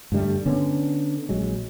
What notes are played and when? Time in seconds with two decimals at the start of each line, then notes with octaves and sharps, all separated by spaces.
0.12 G2 D3 G3 A3
0.46 D3 B3 C#4
1.29 A#1 F#3 G#3